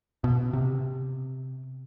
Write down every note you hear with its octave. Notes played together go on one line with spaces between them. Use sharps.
B2
C3